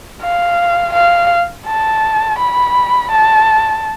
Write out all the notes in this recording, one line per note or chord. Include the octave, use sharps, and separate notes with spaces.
F5
F5
A5
B5
A5